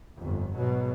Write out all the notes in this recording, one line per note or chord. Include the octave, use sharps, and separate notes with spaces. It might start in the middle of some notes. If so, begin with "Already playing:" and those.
G1 F2
G#2 B2 F#3